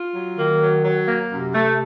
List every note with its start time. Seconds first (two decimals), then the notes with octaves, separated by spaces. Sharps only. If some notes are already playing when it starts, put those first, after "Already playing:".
Already playing: F4
0.15 F#3
0.38 D#3 A#3
0.62 F#3
0.85 F#3
1.08 A#3
1.31 F#2 C3
1.55 A3